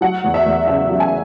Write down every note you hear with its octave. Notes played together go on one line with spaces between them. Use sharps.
F#3 F#5
E2
E5
E2
C#3 E5
F#3
G#5